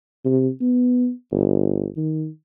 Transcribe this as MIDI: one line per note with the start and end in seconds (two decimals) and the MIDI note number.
0.25 0.49 48
0.61 1.11 59
1.31 1.86 31
1.97 2.28 51